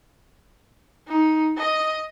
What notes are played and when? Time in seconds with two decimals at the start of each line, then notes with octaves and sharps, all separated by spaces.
1.08 D#4
1.58 D#5